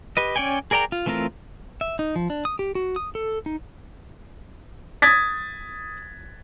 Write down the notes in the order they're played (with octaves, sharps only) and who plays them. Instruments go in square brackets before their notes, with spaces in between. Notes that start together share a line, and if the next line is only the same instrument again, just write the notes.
[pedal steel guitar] G4 B4 D#5
C#4 C#5 D5 G5 G#5
G#4 A#4 D5 G5 A#5
F4
E3 A3 C4 F4 A#4
E5
D#4
F3
D4
D#6
G4
F#4
D#6
A4
D#4
[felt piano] D#6 G#6 A6 B6